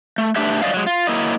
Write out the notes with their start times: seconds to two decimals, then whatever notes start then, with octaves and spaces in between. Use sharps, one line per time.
0.18 A3
0.36 A3 D4 G4 B4 E5
0.62 G2 F#3 D5 D#5 F5
0.74 F#3 G#3
0.87 F4
1.07 F#3 A#3 E4 D#5